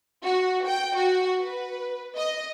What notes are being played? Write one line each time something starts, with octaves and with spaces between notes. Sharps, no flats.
F#4
G5
F#4
B4
D#5